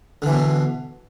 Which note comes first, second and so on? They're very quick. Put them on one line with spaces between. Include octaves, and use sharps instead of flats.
D3 E3 B2